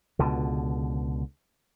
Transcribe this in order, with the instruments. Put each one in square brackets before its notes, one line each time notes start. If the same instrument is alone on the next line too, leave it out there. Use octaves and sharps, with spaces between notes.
[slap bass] C#2 B2 D3